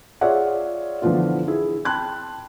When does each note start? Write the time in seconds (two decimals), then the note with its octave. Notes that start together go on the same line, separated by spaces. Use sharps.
0.21 F4 G#4 C#5 D5 E5 F#5
1.02 D3 E3 F3 B3 F4
1.48 E4 G#4
1.85 G5 A5 B5 C6 F#6 G#6